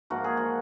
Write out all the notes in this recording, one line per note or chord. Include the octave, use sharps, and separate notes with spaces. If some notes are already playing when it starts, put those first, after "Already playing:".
G#2 F3 A#3 F#4
G#4
F#4